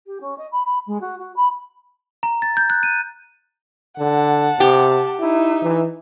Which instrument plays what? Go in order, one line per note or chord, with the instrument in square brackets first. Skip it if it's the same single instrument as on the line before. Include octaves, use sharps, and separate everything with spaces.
[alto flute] G4
C#4
D#5
B5
B5
G#3
F#4
F#4
B5
[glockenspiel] A#5
A6
G6
F#6
D#7
[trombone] D3 [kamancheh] F#5 A5
[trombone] C3 [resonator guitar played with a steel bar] G4
[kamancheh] D#4 E5 [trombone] E4
[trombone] E3